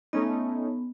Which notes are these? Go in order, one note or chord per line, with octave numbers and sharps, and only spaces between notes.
A3 B3 C#4 D#4